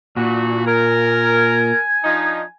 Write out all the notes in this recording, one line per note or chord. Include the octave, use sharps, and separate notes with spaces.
A#2 E3 D4 F#4
A#4 G#5
F3 D4 D#4